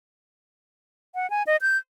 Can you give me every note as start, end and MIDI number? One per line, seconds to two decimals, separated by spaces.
1.15 1.29 78
1.30 1.43 80
1.47 1.57 75
1.61 1.77 91